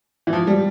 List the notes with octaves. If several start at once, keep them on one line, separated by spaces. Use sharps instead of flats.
E3
F3
G3